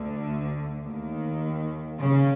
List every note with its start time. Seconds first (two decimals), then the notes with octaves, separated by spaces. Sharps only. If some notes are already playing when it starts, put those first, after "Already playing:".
Already playing: D2 D3
0.84 D#2 D#3
1.99 C#3